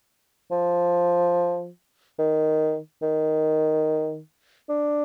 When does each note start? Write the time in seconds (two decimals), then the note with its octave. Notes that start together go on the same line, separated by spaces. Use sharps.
0.51 F3
2.19 D#3
3.02 D#3
4.70 D4